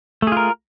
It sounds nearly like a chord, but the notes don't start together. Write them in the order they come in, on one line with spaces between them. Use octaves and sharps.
A3 G#4 F4 A#4